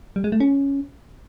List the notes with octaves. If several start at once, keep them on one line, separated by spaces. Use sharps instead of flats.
G3
G#3
A3
C#4